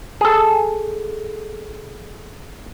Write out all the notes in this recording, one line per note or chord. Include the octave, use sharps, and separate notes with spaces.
G#4 A4